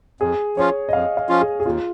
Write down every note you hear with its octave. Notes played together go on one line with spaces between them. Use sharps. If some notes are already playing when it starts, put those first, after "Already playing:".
F2 G#4
F3 C#4 F4 C#5
D#5
F2 F5
F5
F3 C#4 F4
G#4
G#4
D#2 F4